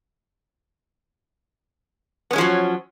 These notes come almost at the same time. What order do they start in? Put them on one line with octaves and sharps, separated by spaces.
B3 C#4 G#3 F3 F#3